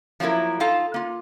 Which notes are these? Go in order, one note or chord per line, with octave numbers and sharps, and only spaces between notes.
F3 F#3 A#3 E4 A#4
D#4 F4 A4 F5 A5
A#3 F4